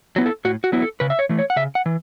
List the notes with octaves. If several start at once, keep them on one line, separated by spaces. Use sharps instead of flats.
F#3 B3 E4
A4
A2 F#4
F#4
F#3 B3 E4
A4
C#3 B4
E5
C#5
E3 A3
C#5
F#5
C#3 E5
F#5
E3